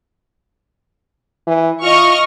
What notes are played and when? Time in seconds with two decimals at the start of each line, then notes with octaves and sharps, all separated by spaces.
1.47 E3
1.83 F4 D#5 C#6 F6